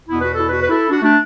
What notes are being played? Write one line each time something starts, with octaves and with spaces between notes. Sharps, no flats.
E2 B2 B3 E4
F#4 B4
E4 A4
F#4 B4
B4
E4 A4
D4 F#4
A3 D4